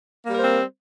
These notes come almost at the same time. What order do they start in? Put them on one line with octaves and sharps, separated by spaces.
A#3 G3 A#4 C5 C4